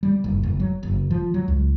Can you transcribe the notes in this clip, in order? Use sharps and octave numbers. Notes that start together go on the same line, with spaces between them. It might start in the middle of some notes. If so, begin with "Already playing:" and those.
G3
F#1
F#1
F#3
F#1
F3
F#3
C#2